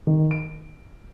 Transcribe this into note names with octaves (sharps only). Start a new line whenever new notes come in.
D#3
D7